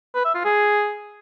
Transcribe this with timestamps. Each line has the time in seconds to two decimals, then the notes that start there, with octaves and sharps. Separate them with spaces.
0.15 B4
0.25 E5
0.35 F4
0.45 G#4